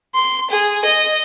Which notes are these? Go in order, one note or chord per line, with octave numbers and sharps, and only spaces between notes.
C6
G#4
D#5